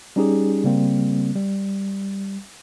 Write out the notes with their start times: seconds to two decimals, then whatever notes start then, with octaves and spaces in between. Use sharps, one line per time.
0.16 G3 C#4 D#4 G4 G#4
0.64 C#3 G3 A#3 C4
1.35 G3